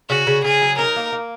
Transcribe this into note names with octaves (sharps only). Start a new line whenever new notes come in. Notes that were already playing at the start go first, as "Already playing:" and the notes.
C#3 F#4
C#3
C#3 G#4
F#3
D#4 A#4
A#3
A#3